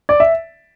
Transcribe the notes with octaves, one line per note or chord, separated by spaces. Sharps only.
D5
E5